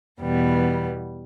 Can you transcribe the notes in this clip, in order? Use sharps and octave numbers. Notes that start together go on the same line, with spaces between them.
E2 B2 G3 B3